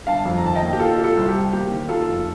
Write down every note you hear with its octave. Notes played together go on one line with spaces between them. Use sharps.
G1 F5 A5
F2
A#5
D#3 A5
D#5 G5
A#3
G4
A#2 F4 A4
C4 G4
F4 A4
C2
G4
C4
A#3 G4
D#2
A#3 F4 A4
F1